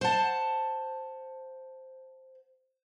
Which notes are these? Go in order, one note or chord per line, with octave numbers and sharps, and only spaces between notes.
C5 F#5 A5